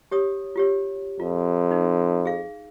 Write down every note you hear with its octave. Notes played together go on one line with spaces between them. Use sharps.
G4 C#5 D#6
F4 G4 C#5
F2 F4
D#4
G#4 F5